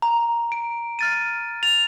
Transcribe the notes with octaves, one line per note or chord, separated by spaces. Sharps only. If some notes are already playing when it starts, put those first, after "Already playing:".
A#5
D7
F6 A6 D#7
A6 F7